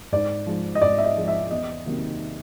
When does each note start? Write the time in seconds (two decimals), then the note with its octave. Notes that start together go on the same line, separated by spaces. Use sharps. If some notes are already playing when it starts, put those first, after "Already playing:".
0.12 G#2 D5
0.47 F3 G#3
0.75 D#5
0.82 G#2 D5
0.98 E5
1.05 D#5
1.17 F3 G#3
1.28 E5
1.51 E2 D#5
1.86 C3 D#3 F#3 A#3